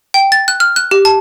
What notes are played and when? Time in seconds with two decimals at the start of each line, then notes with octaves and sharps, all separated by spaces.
0.14 G5
0.32 A6
0.48 F#6
0.60 F6
0.76 F#6
0.91 G4
1.05 A5